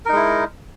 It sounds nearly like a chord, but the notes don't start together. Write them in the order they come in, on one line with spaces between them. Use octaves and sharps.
A#4 D#4 G#3 E4